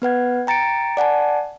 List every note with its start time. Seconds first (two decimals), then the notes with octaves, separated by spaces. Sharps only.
0.02 B3 B4 F#5 G#6
0.47 G5 A#5 A6 C#7 D7
0.97 D5 F#5 G#5 A5